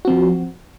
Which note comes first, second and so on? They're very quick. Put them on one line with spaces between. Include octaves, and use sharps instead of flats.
F#4 C4 F3